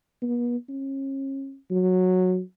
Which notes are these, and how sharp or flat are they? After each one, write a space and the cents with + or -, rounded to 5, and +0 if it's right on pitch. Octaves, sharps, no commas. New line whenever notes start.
B3 -40
C#4 -35
F#3 -10